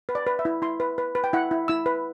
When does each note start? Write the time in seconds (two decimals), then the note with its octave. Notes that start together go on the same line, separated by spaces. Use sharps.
0.09 B4
0.15 D5
0.27 B4
0.39 E5
0.45 E4
0.62 E4 C6
0.80 B4
0.98 B4
1.15 B4
1.24 G5
1.33 E4 F#5
1.51 E4
1.68 E4 E6
1.86 B4